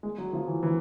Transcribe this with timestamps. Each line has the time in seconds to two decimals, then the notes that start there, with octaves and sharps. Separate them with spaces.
0.03 G#3
0.18 F#3
0.33 F3
0.48 E3
0.63 E3